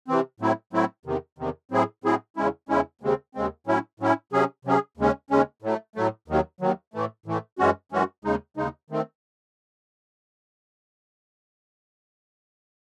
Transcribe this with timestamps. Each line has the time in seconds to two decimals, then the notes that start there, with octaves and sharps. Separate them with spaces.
0.08 C3 E3 C4
0.40 A2 F#3 A3 C4 E4
0.73 A2 F#3 A3 C4 E4
1.05 E2 C3 D#3
1.38 E2 C3 D#3
1.71 A2 F#3 C4 E4 G#4
2.04 A2 F#3 C4 E4 G#4
2.36 E2 C#3 G#3 C#4 E4
2.69 E2 C#3 G#3 C#4 E4
3.01 D#2 C#3 G#3 C4
3.35 D#2 C#3 G#3 C4
3.67 A2 F#3 C#4 E4
4.00 A2 F#3 C#4 E4
4.32 C3 F#3 C#4 G#4
4.65 C3 F#3 C#4 G#4
4.97 D#2 C#3 G#3 C#4
5.30 D#2 C#3 G#3 C#4
5.62 A2 F#3 A3
5.96 A2 F#3 A3
6.28 D#2 D#3 F#3
6.61 D#2 D#3 F#3
6.94 A2 E3 A3
7.26 A2 E3 A3
7.59 F#2 E3 G#3 C#4 F#4
7.92 F#2 E3 G#3 C#4 F#4
8.25 D#2 C#3 G#3 D#4
8.57 D#2 C#3 G#3 D#4
8.90 D#3 A3 C4